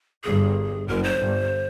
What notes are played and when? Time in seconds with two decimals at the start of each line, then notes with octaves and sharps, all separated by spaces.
0.24 G1 G2 G#4
0.87 F#1 F#2 A#4
1.04 C5
1.19 G1 G2